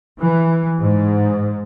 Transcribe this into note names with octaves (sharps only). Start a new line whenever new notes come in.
E3
G#2